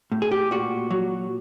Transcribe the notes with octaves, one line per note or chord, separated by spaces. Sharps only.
A2
G#4
G4
A#2 F#4
F#3